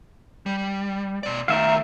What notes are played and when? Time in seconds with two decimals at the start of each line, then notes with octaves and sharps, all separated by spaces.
0.46 G3
1.23 B2 D5
1.48 D#3 A3 A#4 E5 F5